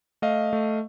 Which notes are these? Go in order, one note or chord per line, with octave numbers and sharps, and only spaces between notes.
A3 D#5 F5
A3